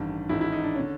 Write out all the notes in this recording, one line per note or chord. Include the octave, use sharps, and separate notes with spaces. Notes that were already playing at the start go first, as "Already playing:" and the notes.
Already playing: A1 G2 D#3
A1 G#2 D#3 E4
E4
D#4
D4
D3 C#4